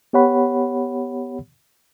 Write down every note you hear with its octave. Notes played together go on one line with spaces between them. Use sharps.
B3 G4 C#5 F#5 B5